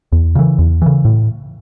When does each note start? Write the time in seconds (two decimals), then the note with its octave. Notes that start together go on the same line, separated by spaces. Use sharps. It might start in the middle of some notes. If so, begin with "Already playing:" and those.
0.12 E2
0.35 C#3 E3
0.59 E2
0.82 C#3 E3
1.05 A2